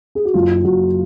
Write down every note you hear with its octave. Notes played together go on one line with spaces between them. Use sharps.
G#4
F#4
F#1 F4
F#1 F#4